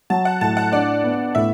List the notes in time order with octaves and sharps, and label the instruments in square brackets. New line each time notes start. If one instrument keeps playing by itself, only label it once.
[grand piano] F#3 [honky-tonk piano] A5
[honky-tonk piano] F#5
[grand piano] A2 [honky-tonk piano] A5
[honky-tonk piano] F#5
[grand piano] D4 [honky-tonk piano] D5
[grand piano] B3
[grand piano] A2 [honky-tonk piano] E5